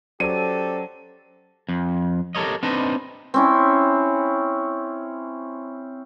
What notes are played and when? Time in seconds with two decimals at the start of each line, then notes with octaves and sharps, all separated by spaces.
0.20 F#3 C#4 G4 A4 C5 D5 D#7
1.69 F2
2.35 G4 A4 A#4 C#5 D#5
2.63 C4 D4 D#4 B4 D#5
3.34 C4 C#4 E4